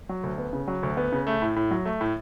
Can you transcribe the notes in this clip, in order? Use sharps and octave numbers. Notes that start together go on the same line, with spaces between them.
F#3
D2
B3
C#3
F#3
D2
B3
C#3
A3
A2
A2
F#3
A3
A2